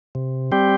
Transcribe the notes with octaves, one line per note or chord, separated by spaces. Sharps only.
C3
G3 C4 G4